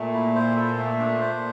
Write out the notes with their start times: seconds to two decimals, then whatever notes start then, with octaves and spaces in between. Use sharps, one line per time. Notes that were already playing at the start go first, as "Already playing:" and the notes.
Already playing: A#2 A3
0.14 E4
0.35 C5
0.56 A4
0.77 A3
0.99 D4
1.21 C5